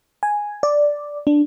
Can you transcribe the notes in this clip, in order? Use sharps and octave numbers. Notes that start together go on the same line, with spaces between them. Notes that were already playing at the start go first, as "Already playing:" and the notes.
G#5
D5
D4